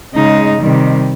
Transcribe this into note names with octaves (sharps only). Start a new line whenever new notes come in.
C#3 G#3 D#4
C3 D#3 G3